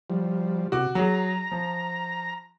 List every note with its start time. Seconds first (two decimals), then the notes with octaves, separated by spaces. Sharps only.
0.10 F3 G3
0.72 C3 F#4 D6
0.95 F#3 G#4 A#5
1.52 F3